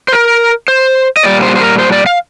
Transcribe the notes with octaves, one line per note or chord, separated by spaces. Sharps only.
C5
A#4
C5
D#5
A#2 G3 D5
C5
C5
A#4
C5
D5
F5